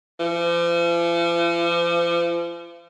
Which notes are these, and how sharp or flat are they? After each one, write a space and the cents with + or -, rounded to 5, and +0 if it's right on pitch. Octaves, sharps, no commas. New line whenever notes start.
F3 -40